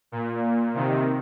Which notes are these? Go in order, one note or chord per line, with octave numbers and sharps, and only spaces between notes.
A#2
C3 D#3